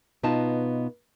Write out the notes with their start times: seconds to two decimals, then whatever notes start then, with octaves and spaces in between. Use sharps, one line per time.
0.23 B2 B3 D#4 F4 A5